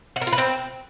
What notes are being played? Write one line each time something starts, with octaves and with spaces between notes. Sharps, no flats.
F#5
A#4
F4
B4
C4